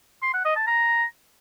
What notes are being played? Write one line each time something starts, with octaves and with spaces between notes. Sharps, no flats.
C6
F#5
D#5
A5
A#5